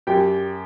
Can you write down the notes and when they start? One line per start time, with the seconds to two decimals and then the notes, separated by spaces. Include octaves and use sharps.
0.07 F#2 G4 G5